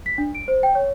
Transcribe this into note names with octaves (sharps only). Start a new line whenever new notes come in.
B6
D4
D7
C5
G5
C#5